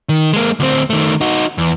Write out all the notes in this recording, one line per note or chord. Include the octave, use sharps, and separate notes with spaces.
D#3
G#3 A#3
D2 C4
D#3 A3
D#4 F#4
E2